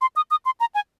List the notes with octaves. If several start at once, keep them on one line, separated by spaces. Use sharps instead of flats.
C6
D#6
D#6
C6
A#5
G#5